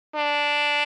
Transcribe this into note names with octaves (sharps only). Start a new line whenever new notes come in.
D4